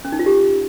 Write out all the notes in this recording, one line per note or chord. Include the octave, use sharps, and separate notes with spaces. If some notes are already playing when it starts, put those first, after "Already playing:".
C#4
D#4
F4
G4